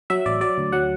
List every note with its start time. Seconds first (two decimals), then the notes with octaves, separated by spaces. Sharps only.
0.10 F#3 E5
0.26 A1 D5
0.41 F#3 D5
0.58 D2
0.72 F#3 F#5